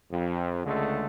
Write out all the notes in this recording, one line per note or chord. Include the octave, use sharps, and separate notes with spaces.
F2
C#2 D3 G#3 A3